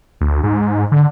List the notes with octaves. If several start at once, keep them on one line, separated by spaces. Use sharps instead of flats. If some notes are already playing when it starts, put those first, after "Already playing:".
D2
G#2
D3